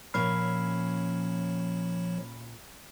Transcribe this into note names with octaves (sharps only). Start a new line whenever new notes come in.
A#2 F3 C#4 C#5 E5 B5 F6 C7